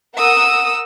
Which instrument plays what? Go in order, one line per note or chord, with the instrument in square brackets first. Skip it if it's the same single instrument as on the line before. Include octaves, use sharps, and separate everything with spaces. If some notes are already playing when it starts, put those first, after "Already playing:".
[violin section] A#4 F#5 D#6 E6